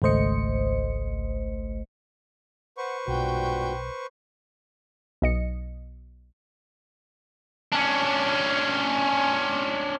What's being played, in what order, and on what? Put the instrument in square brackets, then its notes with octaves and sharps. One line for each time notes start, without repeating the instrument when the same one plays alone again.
[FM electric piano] G#1 C#2 A3 C5 D#5 C#7
[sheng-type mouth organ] B4 C5 C#6 [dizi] F#5
[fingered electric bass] B1 [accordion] G2 A#2 F#4 [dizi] G5
[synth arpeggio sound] B1 D#5 C#7
[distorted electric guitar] C#4 D4